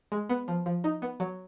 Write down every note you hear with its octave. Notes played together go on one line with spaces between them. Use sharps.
G#3
B3
F3
F3
D#4
B3
F#3